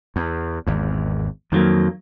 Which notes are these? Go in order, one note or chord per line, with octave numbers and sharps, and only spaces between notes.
E2
G#1 E2
F2 D#3 F#3 A#3